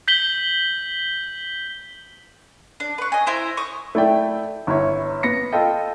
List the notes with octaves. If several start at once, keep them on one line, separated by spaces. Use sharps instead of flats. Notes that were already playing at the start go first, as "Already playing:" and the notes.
G6 B6 F#7 G7
D4
B4 C#6
D#5 G#5
E4 C5 A#5
C#6 D#6
A3 E4 D5 G5
G1 E4 C#5
B3 A#6 C#7
F4 A4 D#5 G5